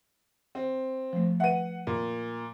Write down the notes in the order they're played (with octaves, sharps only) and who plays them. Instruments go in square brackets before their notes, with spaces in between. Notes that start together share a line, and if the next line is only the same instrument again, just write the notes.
[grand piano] C4
[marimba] F3 A3
[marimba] B4 E5 [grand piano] F#5 D#7
[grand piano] A#2